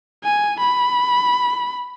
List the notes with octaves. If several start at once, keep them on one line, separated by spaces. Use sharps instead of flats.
G#5
B5